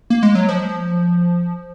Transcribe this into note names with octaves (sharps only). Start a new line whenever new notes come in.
A#3
G#3
F#3
F3